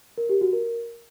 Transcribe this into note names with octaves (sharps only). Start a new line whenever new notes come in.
A#4
G4
F#4
A#4